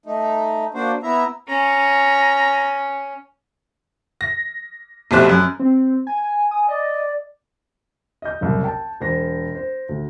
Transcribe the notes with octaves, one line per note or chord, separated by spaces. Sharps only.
A3 D#4
A#3 D4 F#4 C5
B3 E4 E5 A#5
C#4 A#5
A#6
F1 B2 A3 G4 C5 F#6
F#2
C4
G#5
G#5 D#6
D5 D#5
D#5 G6
F#1 C2
G5 A5
E1 C5 A#6
C5
D2